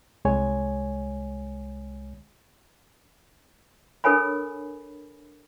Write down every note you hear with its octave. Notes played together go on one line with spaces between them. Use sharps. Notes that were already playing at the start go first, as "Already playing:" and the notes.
C2 G#3 C#5 G#5
D4 A4 A#4 C#5 G#5 B5